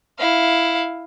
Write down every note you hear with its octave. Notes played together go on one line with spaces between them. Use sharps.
E4 F5